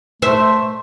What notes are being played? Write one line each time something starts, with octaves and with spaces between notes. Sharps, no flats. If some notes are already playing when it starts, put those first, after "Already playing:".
A3 C5 E5